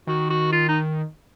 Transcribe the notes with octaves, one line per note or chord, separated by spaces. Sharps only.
D#3 F#4
F#4
F4
D#4